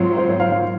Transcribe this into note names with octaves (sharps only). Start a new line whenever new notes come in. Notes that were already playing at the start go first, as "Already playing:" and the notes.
Already playing: G#2 F#3 C4 F4 C#5
C5
C#5
F5
F5